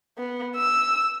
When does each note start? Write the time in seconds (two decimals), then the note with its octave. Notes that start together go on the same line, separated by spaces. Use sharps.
0.18 B3
0.56 E6